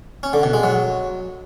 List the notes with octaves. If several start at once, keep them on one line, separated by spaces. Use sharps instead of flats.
C#4
D3
B2
G#3
F#3